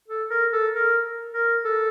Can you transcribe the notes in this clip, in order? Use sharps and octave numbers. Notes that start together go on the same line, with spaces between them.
A4
A#4
A4
A#4
A#4
A4